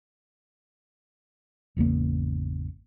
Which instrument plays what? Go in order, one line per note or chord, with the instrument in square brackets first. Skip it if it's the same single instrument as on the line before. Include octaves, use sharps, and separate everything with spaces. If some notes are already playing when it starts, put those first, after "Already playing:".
[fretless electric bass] G#1 E2 C#3 A#3